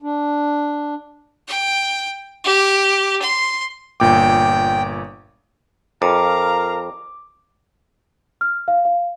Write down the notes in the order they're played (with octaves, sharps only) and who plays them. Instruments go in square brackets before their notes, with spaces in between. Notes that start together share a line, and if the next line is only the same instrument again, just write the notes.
[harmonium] D4
[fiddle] G5
G4
C6
[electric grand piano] G1 A#2 D6 [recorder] G5
[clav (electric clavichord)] F2 [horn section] A#4 F5 A#5 [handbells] D6
[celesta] F6
F5
F5